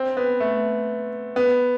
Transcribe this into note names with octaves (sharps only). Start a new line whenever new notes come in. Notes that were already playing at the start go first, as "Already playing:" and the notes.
Already playing: C4
B3
A3
B3